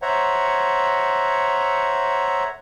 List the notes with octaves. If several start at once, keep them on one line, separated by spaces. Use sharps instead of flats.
C5 C#5 E5 F#5 A#5